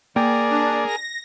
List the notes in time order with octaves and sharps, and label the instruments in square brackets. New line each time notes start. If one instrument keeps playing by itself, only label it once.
[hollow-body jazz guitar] A#3 G5 [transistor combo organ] G#4 A#4 [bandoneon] D5
[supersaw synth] D4
A#6